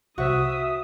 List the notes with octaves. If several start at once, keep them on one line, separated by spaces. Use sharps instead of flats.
C2 C3 F#4 C5 E5 D#6